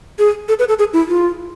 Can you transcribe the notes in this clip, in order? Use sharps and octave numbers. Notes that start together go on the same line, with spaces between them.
G#4
A4
B4
A4
G#4
E4
F4